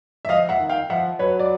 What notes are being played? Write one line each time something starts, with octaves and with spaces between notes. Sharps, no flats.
E5
F3 D#5 F5
E5 F#5
D#3
F5 G5
F3 E5 F#5
F#3 B4 C#5
D5